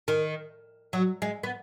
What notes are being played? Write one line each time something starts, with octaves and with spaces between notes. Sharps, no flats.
D#3
F#3
G#3
B3